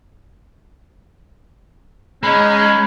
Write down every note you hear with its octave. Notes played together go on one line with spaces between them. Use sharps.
G#3 C#4 D#4 B5